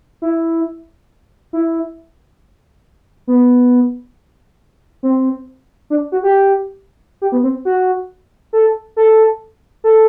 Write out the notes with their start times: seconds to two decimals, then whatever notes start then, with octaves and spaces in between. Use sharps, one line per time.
0.22 E4
1.53 E4
3.27 B3
5.03 C4
5.90 D4
6.12 F#4
6.23 G4
7.22 G4
7.32 B3
7.43 C4
7.65 F#4
8.53 A4
8.96 A4
9.84 A4